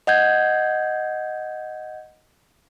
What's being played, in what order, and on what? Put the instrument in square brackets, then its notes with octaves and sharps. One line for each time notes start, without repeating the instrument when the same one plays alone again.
[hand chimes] D#5 F#5 G6 G#6